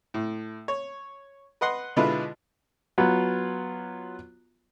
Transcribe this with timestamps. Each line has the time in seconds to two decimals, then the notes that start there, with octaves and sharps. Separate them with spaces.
0.14 A2
0.68 C#5
1.61 B4 D#5 F#5 C6
1.96 B2 D3 G#3 E4 F4 B4
2.98 F#3 B3 F4